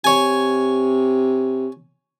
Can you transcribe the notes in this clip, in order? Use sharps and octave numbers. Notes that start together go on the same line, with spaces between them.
C3 C#5 G#5